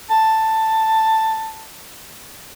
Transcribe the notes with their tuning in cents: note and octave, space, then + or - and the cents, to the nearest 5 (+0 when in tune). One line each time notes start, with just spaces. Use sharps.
A5 +10